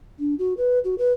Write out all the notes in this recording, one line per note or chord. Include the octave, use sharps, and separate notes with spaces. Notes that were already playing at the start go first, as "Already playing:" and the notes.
D4
F#4
B4
F#4
B4